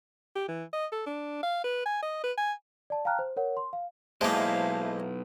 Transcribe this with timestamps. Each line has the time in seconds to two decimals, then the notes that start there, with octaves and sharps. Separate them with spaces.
0.36 G4
0.48 E3
0.73 D#5
0.92 A4
1.06 D4
1.43 F5
1.64 B4
1.86 G#5
2.02 D#5
2.24 B4
2.37 G#5
2.90 D5 A5
3.05 F5 G5 A5 A#5 F6 F#6
3.19 C5
3.36 A#4 C#5 F#5
3.57 C6
3.73 F5
4.21 B1 G#3 A#3 E4 C5 E5 F5 A5